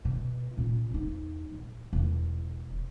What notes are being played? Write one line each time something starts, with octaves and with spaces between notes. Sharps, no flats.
B2
A#2 C#4
E2 D#4
A#1
E1